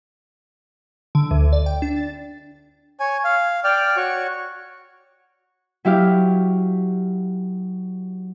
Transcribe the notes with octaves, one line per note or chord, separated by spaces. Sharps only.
D3
D2
D5
G5
D4
A6
C#5 G#5
F5
D5 G5 F6
F#4 C#5 C#6
F#3 E4 G4 F5